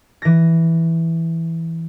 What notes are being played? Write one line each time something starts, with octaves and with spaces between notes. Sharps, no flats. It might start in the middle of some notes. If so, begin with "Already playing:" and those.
E3 A#6